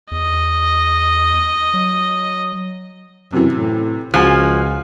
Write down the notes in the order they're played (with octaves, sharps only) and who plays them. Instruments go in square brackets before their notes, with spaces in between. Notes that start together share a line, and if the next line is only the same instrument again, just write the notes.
[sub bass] E2 [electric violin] D#5
[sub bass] F#3
[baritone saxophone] F#2 [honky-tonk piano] C3 E3
[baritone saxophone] A2
[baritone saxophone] C#2 [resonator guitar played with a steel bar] F3 [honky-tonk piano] F#4 G#5 F6